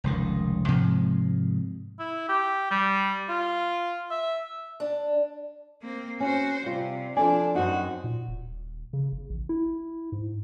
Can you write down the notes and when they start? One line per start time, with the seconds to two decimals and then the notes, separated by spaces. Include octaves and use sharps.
0.04 F1 C#2 D#3
0.68 G#2 C3 F3 G#3
1.99 E4
2.29 G4
2.71 G3
3.29 F4
4.11 E5
4.80 D4
5.82 A#3 C4
6.20 C#4 F#4 C5
6.66 C3 G3 F4
7.17 F3 D4 A4 D5 G#5
7.55 F#2 C4 D#4 F#4
8.04 A#2
8.28 D#1
8.93 C#3
9.13 G1
9.30 A1
9.49 E4
10.12 G#2